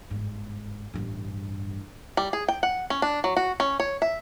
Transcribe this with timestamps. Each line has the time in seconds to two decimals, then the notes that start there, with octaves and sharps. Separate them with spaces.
0.10 G1 G#2
0.94 A1 G2
2.17 G3
2.33 G#4
2.48 G5
2.63 F#5
2.90 C#4
3.02 D4
3.24 F#3
3.36 F#4
3.60 C#4
3.80 C#5
4.02 E5